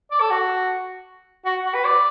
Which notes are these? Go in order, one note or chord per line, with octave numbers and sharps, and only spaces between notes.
D5
A4
F#4
F#4
F#4
B4
D5